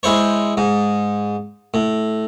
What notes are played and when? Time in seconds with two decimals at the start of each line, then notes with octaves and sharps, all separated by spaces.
0.03 G#3 E4 C5 C#5
0.57 G#2
1.74 A2